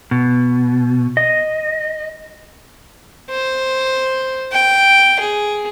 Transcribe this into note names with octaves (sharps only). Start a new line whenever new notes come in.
B2
D#5
C5
G5
G#4